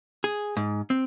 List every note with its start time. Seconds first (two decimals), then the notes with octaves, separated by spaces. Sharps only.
0.24 G#4
0.57 G#2
0.90 C4